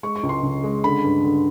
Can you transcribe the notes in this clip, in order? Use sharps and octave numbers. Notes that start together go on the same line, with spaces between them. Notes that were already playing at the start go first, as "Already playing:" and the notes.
G#3 C#6
C#6
C#2
C6
C#3
G#3
D3 B5
G2
D3